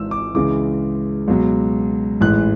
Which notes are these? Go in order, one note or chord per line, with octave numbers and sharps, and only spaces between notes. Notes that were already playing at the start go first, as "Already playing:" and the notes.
Already playing: G#1 G#2 E3 E6
D6
C#2 C#3 E3 D6
C#2 B2 F#3
A1 G#2 E3 F#6